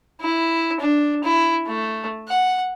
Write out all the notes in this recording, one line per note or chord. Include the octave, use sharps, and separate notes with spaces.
E4
D4
E4
A3
F#5